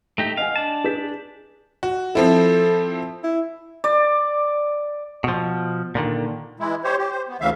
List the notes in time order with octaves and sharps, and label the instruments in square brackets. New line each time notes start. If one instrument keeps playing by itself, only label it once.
[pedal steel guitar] A3 D#4 G4 [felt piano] G5
[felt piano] D#5 F#5 G#5 [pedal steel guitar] F5
[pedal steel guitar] D4 A5
[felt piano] G#4 G6 B6
[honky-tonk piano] F#4
[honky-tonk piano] F3 C4 E4 [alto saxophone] A4
[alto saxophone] E4
[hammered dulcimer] D5
[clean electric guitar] B2 F3
A#2 D3 D#3
[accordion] E3 G#3 E4
G4 C5 C#5
G4
C5
B3
D2 C#3 E3 E5 F5